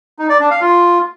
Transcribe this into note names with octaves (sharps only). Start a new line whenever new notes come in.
D#4
D5
D4
F5
F4